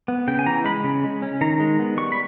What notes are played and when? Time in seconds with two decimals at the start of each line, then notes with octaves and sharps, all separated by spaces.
0.08 B3
0.28 C#3 G5
0.39 G#5
0.46 E3 A#5
0.64 G#3 B5
0.84 C#3
1.04 G#3
1.22 C#4
1.41 D#3 A#5
1.60 G#3
1.79 B3
1.97 G3 C#6
2.12 B5